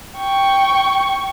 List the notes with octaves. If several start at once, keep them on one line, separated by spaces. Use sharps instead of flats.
G5 C#6